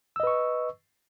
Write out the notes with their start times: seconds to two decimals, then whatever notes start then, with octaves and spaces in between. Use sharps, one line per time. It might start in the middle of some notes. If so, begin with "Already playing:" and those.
0.16 E6
0.20 D#5
0.23 B4
0.27 C#6